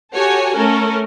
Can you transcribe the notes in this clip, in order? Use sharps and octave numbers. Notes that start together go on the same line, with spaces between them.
F#4 G4 A4 C#5 F#5 G#5
A3 C#4 A4 A#4